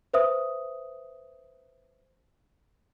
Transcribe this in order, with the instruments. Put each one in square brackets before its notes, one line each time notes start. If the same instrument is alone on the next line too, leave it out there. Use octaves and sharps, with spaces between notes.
[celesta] B4 C5 E5 D#6